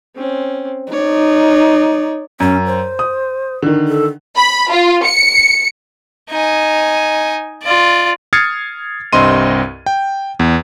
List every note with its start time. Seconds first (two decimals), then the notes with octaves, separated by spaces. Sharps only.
0.16 C4 C#4
0.92 D#4 C#5 D5
2.40 F#2 C#4
2.66 C5
2.99 D#6
3.62 D3 D#3
3.88 A4
4.37 B5
4.72 F4
5.06 C#7
6.31 D#4 G#5
7.63 F4 D5
8.33 D#6 F6 G#6 A6 C7 C#7
9.13 C2 G2 C4 D#5 C6 D#7
9.86 G5
10.39 E2